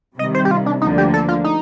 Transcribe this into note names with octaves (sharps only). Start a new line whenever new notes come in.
C3 D#3 G3 D#5
C5
G4
F4
D4
D2 D3 F3 A#3 D4 D#4
G4
A4
F4
D#4